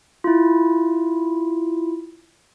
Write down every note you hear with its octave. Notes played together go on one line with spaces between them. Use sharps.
E4 F4